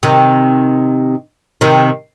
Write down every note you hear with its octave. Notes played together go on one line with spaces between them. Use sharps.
C3 D#3
C3 D#3